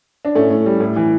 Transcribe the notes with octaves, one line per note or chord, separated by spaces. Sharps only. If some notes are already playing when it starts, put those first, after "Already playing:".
D4
A2 A3 C#4
A2
G3
A2
E3